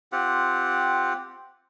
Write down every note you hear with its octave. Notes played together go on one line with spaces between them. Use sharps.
C4 F4 G4 F#5